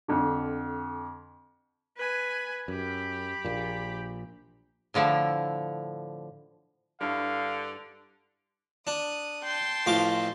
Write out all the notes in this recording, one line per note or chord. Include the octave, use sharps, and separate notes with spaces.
F2 D3
B4 G#5
F#2 G4 B5
A#1 A#2
A2 D3 F3 E4
G2 D3 E4 C#5 F5
D4 D#6
G5 A5 C6
A1 F3 D6